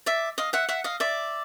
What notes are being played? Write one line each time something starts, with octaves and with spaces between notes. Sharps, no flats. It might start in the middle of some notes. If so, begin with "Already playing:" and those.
D5 E5
D#5 F5
E5 F#5
E5 F#5
D#5 F5
D5 E5